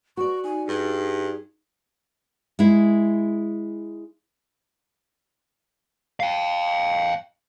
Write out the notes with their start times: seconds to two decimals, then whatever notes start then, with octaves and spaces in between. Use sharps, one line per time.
0.17 F#4 D5 C#6
0.44 D#4 G#5
0.67 G2 G#4
2.59 G#3 E4
6.20 F5 G5